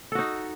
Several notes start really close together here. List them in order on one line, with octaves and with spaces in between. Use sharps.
A4 F#4 D#4